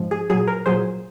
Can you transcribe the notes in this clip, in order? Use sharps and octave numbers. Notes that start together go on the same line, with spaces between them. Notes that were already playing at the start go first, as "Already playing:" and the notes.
Already playing: G#2 F3 G#3
G#4
A#2 F#3 G#4
A#4
A#2 F#3 G#4 C5